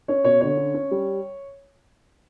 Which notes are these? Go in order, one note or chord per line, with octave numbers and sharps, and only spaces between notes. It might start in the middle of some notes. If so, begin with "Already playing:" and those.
C#4 C#5
B2 C#5
D3 C#5
C#4
C#4
G3